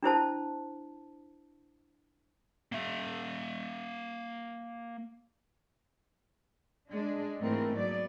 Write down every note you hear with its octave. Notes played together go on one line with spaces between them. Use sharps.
D4 E4 C5 A5
A#3 E5
G#3 D4
G#2 E3 A3 A#3 C4 A#4
F#3 A#3 B3 D5